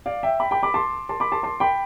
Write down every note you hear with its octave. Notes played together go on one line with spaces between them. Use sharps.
D5 F5
E5 G5
G5 B5
G5 B5
B5 D6
A5 C6
A5 C6
B5 D6
A5 C6
A5 C6
G5 B5